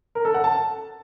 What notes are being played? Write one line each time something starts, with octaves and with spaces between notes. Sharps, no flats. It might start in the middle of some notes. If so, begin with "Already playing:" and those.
A#4
A4
F#5
A5